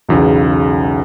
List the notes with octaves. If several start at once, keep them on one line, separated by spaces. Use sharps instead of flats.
B1 E2 C#3